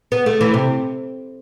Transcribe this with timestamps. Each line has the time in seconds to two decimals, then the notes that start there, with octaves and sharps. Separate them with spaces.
0.12 B3
0.26 A3
0.41 E3
0.54 C3